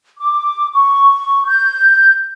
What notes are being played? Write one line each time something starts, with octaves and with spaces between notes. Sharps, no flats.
D6
C#6
G6